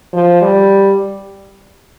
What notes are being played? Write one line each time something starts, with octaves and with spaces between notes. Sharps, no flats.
F3
G3